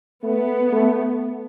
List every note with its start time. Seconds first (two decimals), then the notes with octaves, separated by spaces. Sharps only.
0.23 A3 B3
0.73 A3